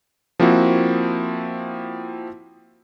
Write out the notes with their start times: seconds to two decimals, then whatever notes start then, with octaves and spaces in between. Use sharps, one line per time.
0.40 F3 A#3 C4 E4 F#4